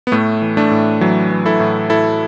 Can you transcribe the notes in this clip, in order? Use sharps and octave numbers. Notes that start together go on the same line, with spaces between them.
B3
A2 A3
E3
A3 D4
A2
E3 F#3
E3
E4 A4
A2
A2 E4 A4